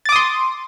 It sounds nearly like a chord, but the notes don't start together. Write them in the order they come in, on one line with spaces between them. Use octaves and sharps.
A6 D6 D#6 C6